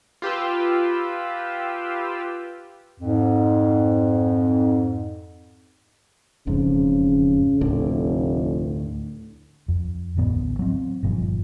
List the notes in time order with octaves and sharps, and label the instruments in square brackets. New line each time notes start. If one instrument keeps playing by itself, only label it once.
[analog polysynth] F4 G4 B4 E6
[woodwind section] F2 G#2
[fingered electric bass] E1 F2 G#2 [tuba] C#3
[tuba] F1 [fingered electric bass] D2 A2 D3
[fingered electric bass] F2
A1 D2 A2 B3
F#3 C4
G1 G2 A#2 F3